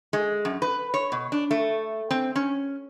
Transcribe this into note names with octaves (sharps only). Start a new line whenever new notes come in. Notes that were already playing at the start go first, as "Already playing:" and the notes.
G#3
F#2
B4
C#5
B2
D4
A3
C4
C#4